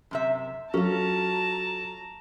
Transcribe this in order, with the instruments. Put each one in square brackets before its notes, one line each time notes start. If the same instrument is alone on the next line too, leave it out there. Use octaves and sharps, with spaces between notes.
[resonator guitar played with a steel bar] F#2 C3 E5
[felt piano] F#3 A4 [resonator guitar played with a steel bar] C#4 F4 [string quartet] A5 A#5